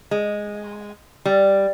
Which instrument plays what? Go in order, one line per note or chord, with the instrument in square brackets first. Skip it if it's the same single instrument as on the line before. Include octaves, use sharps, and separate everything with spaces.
[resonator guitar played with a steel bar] G#3
G3